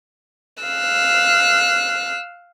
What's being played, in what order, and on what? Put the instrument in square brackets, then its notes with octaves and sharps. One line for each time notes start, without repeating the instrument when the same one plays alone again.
[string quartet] F5 E6 F#6